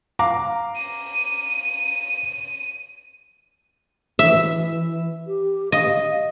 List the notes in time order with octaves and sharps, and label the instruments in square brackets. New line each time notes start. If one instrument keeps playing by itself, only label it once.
[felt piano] F5 A#5 D6
[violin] D#7
[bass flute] E3 [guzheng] E5
[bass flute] G4
[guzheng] D#5 [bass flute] F5